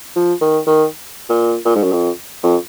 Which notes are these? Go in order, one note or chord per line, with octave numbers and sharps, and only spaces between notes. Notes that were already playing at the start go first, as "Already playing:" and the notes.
F3
D#3
D#3
A#2
A#2
G#2
F#2
F2
F2